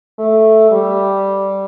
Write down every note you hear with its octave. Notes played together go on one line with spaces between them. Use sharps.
A3
G3